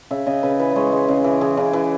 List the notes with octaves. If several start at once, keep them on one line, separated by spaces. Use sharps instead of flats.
C#3 E5
C#3 D#5
C#3 B4
E3 B4
G#3 C#5 D#5
G#3
C#3
E3
E3 G#4
C#3
E3